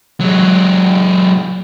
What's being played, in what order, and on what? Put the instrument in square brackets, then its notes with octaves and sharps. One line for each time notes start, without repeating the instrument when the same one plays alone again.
[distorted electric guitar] F#3 G#3